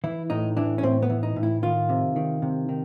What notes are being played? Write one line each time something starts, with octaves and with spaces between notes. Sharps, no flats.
E3 E4
A2 D#4
E3 D4
C#4
A2 C4
B3
E3
D#4
A2
E4
D#3 F4
C3
D#3
C3
D#3